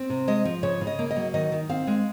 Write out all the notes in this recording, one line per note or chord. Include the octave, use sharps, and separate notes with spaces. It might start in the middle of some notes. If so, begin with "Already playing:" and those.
Already playing: C4
C3
G#3 D#5
F3
C#3 C#5
C#3
D#5
A#3
D#5
F#3
D#3 D#5
D#3
C4 F5
G#3